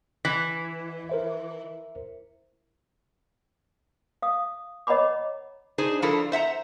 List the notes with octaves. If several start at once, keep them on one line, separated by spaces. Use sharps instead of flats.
E3 B6
A#4 C5 E5
F5 D#6
C#5 D#5 F#5 A#5 B5 D6
D4 D#4 G#4 C5
F3 D4 E4 F4 A4 A#4
C5 E5 F#5 A#5